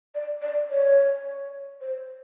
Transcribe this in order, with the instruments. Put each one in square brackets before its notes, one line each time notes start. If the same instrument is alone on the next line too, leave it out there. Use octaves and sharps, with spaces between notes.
[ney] D5
D5
C#5
C5